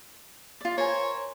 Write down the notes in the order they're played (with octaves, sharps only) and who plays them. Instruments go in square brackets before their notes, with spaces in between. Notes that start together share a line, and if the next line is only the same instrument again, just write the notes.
[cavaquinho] F4 D5
[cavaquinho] A#4 C5 G#5 [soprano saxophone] C#5